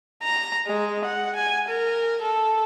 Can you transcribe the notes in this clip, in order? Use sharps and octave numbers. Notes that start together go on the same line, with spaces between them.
A#5
G#3
F#5
G#5
A#4
A4